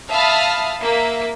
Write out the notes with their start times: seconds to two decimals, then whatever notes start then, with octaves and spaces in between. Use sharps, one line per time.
0.10 E5 F5 A5 B5 D#6 F6
0.82 A#3 E5